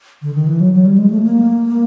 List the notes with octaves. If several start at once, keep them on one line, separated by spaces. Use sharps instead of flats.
D3
D#3
E3
F#3
F#3
G3
G#3
A3
A#3